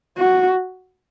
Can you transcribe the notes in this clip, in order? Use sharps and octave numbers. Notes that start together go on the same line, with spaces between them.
F#4